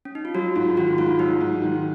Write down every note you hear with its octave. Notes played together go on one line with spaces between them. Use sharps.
C#4
D#4
F4
F#3 F#4
G#2 F4
D#3 F#4
G#2 F4
F#3 D#4
G#2
D#3